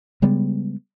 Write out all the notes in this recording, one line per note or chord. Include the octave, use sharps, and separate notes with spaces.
C#3 G3 G#3 B3